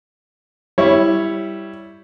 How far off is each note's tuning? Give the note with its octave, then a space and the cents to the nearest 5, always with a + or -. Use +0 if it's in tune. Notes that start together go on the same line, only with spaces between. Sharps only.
G3 +0 E4 +0 C#5 +0